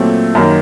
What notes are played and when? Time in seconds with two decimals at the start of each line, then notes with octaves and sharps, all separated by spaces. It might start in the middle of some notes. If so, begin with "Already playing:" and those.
Already playing: A#2 F#3 A3 C4
0.35 F#2 D#3 A#3